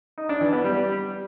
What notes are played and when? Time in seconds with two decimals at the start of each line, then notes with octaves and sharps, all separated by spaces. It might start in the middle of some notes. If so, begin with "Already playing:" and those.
0.18 D#4
0.29 D4
0.41 E3
0.53 B3
0.64 G3